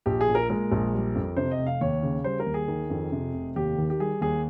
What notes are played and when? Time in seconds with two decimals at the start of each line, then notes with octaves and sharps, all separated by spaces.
0.06 A#1 G4
0.21 G#4
0.28 A#2
0.35 A#4
0.50 G#3 A#4
0.72 A#1
0.93 G3
1.15 F2
1.37 C3 C5
1.51 D#5
1.59 F1
1.67 F5
1.81 D#2 C#5
2.03 C#3
2.24 G3 C5
2.40 A#4
2.46 D#2
2.54 G#4
2.68 D#3
2.90 F2
3.12 C3
3.34 F1
3.56 D#2 G4
3.78 D#3
3.90 G4
4.00 G3 G#4
4.21 D#2 G#4